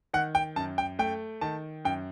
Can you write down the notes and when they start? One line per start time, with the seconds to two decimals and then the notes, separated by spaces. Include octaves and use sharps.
0.14 D#3 F#5
0.35 G5
0.56 F#2 A5
0.78 G5
0.99 A3 G5
1.41 D#3 A5
1.85 F#2 G5